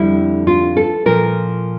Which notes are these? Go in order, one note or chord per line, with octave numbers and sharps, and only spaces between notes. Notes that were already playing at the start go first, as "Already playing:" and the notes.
Already playing: F2 D3 G3 E4
F4
A4
A#2 F3 A#4